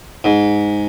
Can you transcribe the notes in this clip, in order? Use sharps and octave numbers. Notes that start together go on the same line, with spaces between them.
G#2